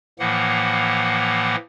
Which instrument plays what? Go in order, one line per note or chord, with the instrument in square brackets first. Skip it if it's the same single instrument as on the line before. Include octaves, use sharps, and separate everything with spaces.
[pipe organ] A2 E3 F3 A#3 F#5